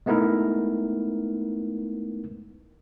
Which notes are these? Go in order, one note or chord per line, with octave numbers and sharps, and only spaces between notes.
G#3 A3 B3 D#4 E4 A#4